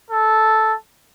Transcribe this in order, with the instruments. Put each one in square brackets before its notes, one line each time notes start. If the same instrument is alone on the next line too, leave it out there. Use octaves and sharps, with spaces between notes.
[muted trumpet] A4